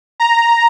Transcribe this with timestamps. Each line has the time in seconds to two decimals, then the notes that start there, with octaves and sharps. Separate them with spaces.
0.20 A#5